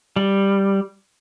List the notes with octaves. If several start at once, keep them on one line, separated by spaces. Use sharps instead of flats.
G3